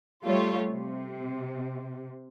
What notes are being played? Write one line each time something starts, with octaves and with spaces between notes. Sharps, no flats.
G3 A3 F4 C#5
C3